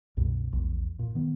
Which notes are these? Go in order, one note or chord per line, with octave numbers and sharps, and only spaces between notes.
C2 F#2 B2
A#1 E2
A#2
D#3 B3